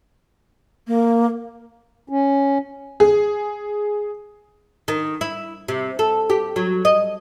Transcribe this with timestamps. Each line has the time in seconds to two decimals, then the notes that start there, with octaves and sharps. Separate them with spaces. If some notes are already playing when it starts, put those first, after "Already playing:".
0.87 A#3
2.09 C#4
3.00 G#4
4.88 D#3
5.21 E4
5.68 C3
5.99 A4
6.30 G4
6.56 F#3
6.85 D#5